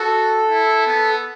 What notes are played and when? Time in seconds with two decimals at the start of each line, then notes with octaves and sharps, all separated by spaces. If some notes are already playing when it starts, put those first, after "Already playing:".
Already playing: F#4 A4
0.50 E4
0.87 B3